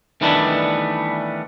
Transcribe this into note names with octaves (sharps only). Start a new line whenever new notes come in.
D#3 E3 G3 A3 B3 D4